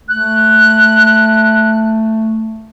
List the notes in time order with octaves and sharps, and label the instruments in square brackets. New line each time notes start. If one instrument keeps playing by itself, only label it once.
[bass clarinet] A3 [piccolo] F#6